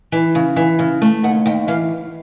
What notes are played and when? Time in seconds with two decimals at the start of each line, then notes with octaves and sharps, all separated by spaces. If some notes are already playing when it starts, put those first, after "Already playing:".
0.12 E3
0.35 C#3
0.56 E3
0.79 C#3
1.02 A3
1.24 D#2 F#5
1.46 D#2 G5
1.68 E3 F5